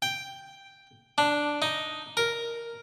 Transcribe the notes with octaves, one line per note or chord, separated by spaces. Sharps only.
G5
D4
D#4
A#4